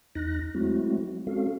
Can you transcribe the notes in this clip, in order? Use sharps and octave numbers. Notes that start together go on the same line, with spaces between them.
E2 D#4 F#6 A#6
F#3 G#3 A3 C4 E4 F#4
G#3 C4 C#4 F#4 A4 F5